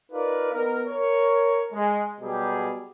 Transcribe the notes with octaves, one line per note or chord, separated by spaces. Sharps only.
D#4 F4 A#4 B4 D5
B3 D#4 A#4
A#4 C#5
G#3
B2 F#3 G3 G4 G#4